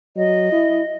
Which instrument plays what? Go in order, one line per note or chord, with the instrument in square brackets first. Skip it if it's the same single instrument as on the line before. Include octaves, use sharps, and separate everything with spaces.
[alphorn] F#3 [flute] D#5
[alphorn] E4